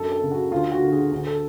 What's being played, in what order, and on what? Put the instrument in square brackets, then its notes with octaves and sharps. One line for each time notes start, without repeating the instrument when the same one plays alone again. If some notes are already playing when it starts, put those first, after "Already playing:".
Already playing: [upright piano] F#2 A4
A4
C#3
F#4
D2 F4
F#4
D3
G#4
D2
A4